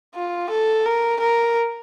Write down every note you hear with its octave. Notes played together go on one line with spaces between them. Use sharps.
F4
A4
A#4
A#4